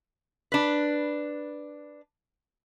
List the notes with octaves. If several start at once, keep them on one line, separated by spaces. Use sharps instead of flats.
D4 B4